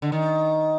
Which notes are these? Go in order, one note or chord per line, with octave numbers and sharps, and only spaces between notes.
D3
D#3